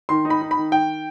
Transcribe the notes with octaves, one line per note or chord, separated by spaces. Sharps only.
D#3 C6
D#4
B5
D#4
B5
D#3
D#3 G5